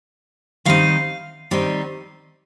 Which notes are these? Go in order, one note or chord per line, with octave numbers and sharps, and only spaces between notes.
D#3 G3 C4 D#4 F5
D#3 G3 C4 D#4